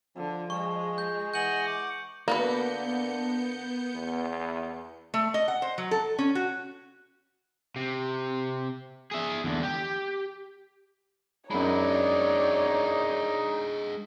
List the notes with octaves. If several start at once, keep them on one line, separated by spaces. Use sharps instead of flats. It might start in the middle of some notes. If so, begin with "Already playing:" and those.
D3 F3
G#3 C#6
G6
E3 D#5 F#5 G#5 G6 F#7
F#5 D6
D3 A#3 B3 F#4 A#4 B4 G6 C#7
E2
A3
D#5
F#5
C5
F#3
A4
C#4
F#4
C3
G#4 E5
E2 D3
G4
F#2 G#3 D4 D#4 C#5 D5 B5